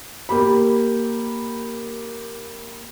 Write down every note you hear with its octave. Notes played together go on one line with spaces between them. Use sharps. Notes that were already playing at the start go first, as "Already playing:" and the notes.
A#3 G4 B5